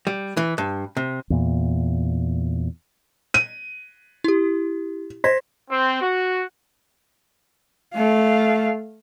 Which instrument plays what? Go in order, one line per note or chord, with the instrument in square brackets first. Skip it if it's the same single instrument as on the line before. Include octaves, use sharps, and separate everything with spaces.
[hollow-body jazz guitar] G3
E3
G2
C3
[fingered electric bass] E2 A#2
[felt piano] D#7
[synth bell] E4 G4
[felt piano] C5 [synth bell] G#6 A#6 B6
[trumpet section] C4
F#4
[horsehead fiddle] A3 F5